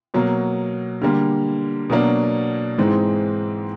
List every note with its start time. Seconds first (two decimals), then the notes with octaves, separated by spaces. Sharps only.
0.14 B2 F#3 A#3
1.02 D3 G3 A#3
1.90 B2 F#3 A#3 D4
2.78 G#2 E3 G#3 C4 D#4